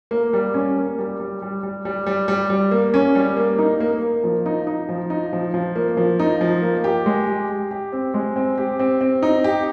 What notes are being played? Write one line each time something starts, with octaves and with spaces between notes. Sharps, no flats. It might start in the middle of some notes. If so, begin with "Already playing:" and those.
A#3
G3
C#4
A#3
G3
G3
G3
G3
G3
G3
G3
G3
A#3
C#4
G3
A#3
D#4
A#3
A#3
F3
D#4
D#4
F3
D#4
F3
F3
A#3
F3
D#4
F3
A#3
G4
G#3
G4
G4
G4
C4
G#3
C4
G4
C4
C4
D#4
G4